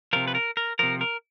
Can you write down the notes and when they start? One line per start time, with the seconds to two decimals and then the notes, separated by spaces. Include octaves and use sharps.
0.13 C3 F3 A#4
0.28 B4
0.35 A#4
0.57 A#4
0.79 C3 F3 A#4
1.01 A#4